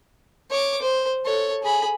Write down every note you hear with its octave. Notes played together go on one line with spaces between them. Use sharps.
C#5 D6
C5
A4 C#5
G#4 B5